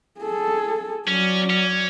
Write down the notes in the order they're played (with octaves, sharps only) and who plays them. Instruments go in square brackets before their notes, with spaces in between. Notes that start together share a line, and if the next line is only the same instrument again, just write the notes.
[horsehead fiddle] G#4 A4
[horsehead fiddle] F#3 D5 [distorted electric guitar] C#4
[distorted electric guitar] C#4